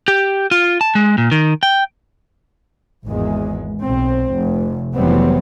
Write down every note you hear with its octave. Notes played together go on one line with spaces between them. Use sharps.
G4
F4
A5
G#3
A#2
D#3
G5
G#1 E2 G#3
B1 C4
F1
F1 E3 F#3 G3 B3 C4